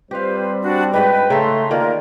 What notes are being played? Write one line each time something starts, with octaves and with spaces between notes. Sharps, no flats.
G3 C4 F4 G4 B4 C5 F5
D4 F#4
G#2 D#4 B4 G5
C#3 A3 A4 E5 A#5 C6
D3 D#3 A#3 F4 A#4 D5